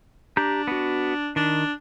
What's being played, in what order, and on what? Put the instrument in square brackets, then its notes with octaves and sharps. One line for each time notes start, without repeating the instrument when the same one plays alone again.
[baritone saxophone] D4 [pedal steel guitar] G4 A#5 G6
[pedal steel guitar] B3 F#4
[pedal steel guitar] D#3 [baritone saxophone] D4